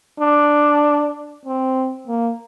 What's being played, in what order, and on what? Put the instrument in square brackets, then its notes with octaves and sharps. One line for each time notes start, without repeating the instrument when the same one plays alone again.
[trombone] D4
C4
A#3